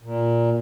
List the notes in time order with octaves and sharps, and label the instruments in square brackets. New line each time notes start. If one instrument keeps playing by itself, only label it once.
[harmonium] A#2